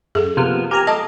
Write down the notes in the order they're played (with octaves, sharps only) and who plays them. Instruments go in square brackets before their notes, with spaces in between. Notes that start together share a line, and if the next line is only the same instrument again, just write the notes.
[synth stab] F#2 [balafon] G#4 A4
[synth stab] C3 F6 [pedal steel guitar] F3 A#3 B3
[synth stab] G4 G#5 A#5 [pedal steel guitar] A#4
[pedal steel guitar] G#3 A4 D6 [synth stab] D#5 [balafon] A5